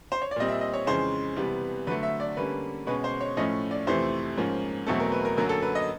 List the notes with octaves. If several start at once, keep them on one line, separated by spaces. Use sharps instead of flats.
C5
C#5
D5
A#2 G3 C4 D#5
E5
D#5
C#5
F2 C#3 E3 G#3 C#4 C5
C3 E3 G3 B3
D3 F#3 A3 B4
E5
D5
D3 G3 A#3 C#4 B4
B2 G#3 C#4 B4
C5
C#5
A2 F3 A3 C#4 D#5
D5
F2 C3 E3 A3 C5
G#2 F3 A#3 C#4
E2 B2 F#3 A3 C4 A4
A#4
B4
A#4
F#2 D3 F#3 A#3 A#4
A4
B4
D#5